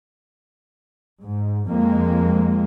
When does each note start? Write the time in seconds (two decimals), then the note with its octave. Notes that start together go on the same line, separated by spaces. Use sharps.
1.22 G#2
1.69 F2 G#3 A#3